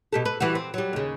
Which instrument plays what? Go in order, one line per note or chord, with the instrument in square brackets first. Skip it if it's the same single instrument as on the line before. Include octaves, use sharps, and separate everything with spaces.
[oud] B2 G4 A4
B4
E3 G3 F#4
C4
F#3 G3
D#2 C#3